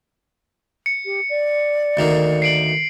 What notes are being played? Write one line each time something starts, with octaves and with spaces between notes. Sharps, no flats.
C#7
G4
D5
D2 D#3 A#3
C7 D7 F#7